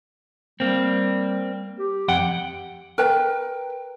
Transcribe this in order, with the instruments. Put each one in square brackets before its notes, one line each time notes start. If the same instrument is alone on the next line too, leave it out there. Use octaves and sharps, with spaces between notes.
[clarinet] G3 [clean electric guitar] A#3 C4
[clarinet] G4
[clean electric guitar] F2 F#5 G5
[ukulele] A#4 B4 G5